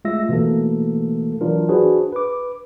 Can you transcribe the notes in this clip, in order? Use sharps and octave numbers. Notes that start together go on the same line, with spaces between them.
G#3 A3 F4 E5 E6 A#6
B2 E3 A3 A#3 A4
E3 F#3 D4 F4 A#4
D4 F#4 G#4 B4 C5
B4 D6